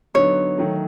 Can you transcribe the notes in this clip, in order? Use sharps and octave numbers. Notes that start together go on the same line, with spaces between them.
D3 F#3 B3 D#4 C#5
D#3 F#3 A3